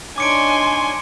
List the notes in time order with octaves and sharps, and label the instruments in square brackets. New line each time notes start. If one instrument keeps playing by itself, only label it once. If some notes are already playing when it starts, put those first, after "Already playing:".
[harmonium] D4 D#4 C#5 [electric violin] G#5 C6 [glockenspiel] D6 C#7 D7